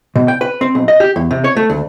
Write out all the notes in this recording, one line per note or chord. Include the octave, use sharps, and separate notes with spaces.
B2
G5
B4
C4
B1
D#5
G4
E2
C3
C#5
A3
D2